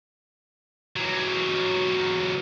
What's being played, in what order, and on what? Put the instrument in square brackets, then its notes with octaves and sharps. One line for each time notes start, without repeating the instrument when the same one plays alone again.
[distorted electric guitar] E3 F#3